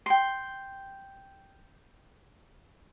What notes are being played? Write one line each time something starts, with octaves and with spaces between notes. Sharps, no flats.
G5 C6